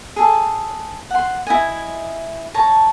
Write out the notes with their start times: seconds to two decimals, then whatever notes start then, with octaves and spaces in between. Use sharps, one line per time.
0.16 G#4 A4
1.11 F#5 C6
1.47 E4 D#5 G#5
2.54 C#5 A5 A#5